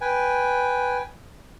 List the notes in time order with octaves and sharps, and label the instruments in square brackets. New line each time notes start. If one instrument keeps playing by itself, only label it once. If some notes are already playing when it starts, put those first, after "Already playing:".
[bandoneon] B4 G5 G#5